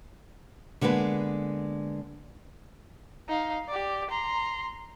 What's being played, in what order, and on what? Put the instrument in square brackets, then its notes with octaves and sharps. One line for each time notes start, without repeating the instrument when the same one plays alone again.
[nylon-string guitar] D3 G#3 A#3 B3 B4
[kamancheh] D#4 F5
G4 D5
A#5 C6